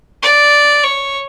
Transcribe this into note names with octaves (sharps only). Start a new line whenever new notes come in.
D5
C#5